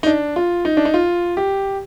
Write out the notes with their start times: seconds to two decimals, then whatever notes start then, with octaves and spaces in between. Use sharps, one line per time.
0.03 D#4
0.07 D4
0.36 F4
0.65 D#4
0.77 D4
0.85 D#4
0.94 F4
1.37 G4